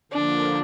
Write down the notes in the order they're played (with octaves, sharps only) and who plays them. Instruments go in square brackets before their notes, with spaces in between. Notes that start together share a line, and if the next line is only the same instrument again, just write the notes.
[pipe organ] D3 F3 A#3 [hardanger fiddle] D4